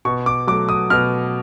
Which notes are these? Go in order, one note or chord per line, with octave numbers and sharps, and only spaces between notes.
B2 C#6
D6
F#3 A3 D6
D#6
B2 F6